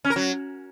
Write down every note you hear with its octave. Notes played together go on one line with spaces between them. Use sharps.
C#4
A#4
F#3